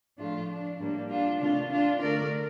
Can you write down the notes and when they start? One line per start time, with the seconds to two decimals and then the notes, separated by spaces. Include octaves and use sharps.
0.18 A2 F3 A3 D4 F4
0.49 D4
0.80 A2 G3 A#3 D4
1.09 D4 F4
1.40 C3 D#3 A3 D4 F4
1.71 D4 F4
2.01 D3 A3 A#4 D5